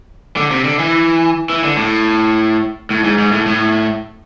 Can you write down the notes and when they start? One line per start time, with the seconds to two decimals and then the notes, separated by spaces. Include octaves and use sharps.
0.37 D3
0.51 C3
0.65 D3
0.79 E3
1.50 E3
1.64 D3
1.77 A2
2.90 A2
3.04 G#2
3.18 G#2
3.32 A2
3.46 A2